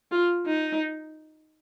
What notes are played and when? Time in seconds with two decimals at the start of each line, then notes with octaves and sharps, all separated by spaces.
0.11 F4
0.46 D#4